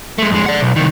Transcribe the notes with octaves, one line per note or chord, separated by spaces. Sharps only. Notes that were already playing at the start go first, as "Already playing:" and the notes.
G#3 A3
F2 G#3
D5 F#5
B1
C2 D#3